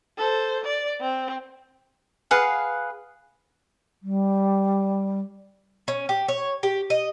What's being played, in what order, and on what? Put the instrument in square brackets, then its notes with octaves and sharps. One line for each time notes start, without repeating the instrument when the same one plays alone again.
[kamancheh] A4 C5
D5
C4
[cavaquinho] G#4 B4 F5 F#5
[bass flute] G3
[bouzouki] C#4
G4
C#5
G4
D#5